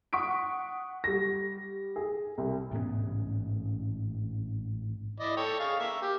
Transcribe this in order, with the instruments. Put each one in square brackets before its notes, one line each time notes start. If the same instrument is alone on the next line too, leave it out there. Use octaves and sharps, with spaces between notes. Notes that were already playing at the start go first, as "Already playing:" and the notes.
[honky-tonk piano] F#5 C#6 D#6 B6 D7
G3 A#6
G#4
C2
[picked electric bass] A1 G#2 B3 C#4
[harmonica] E4 D5 D#5
A4 C#5 G5
G#4 F5 C#6
A#3 E5
G4